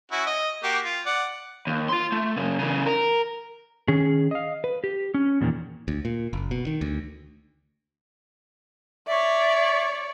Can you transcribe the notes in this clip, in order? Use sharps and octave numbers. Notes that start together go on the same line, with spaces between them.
C#4 E4 F#4
D#5
A#3 F#4 G4
F4
D5 F#5
D#2
F4 C6
A3
F#2 C#3
C#3 E3
A#4
D#3 C#4 G#4
D#5 F5
B4
G4
C#4
E2 A#2 D3 D#3
D2
A#2
F#1
B2
D#3
D2
C#5 D5 E5